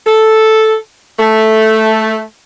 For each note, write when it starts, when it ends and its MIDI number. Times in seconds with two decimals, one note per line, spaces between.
0.07 0.75 69
1.19 2.21 57